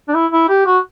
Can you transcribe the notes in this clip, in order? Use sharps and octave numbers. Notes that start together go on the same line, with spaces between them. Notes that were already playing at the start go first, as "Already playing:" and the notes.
D4
E4
E4
G4
F#4